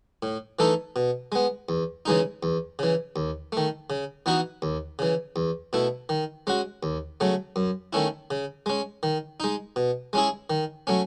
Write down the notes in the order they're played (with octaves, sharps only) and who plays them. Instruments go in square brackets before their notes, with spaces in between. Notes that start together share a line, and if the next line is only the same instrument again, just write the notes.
[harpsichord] A2
E3 A3 D#4 A4
B2
G#3 B3
E2
C#3 E3 G#3 D#4
E2
C#3 E3
D#2
D#3 A3
C#3
E3 B3 D#4 F#4
D#2
C#3 E3
E2
B2 A3 E4
D#3
G#3 C#4 F#4
D#2
C#3 F#3 A3
F#2
D#3 A3 C#4 E4
C#3
G#3 C#4
D#3
G#3 D#4
B2
G#3 C#4 E4 G#4
D#3
F#3 A3 C#4